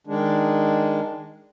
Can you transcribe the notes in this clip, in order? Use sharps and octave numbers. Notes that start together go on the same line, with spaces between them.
D#3 G#3 D4